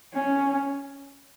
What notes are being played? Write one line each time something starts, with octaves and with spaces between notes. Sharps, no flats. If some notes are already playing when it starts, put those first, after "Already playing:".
C#4